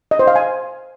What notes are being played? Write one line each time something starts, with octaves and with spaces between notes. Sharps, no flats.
D#5
C5
F5
G#5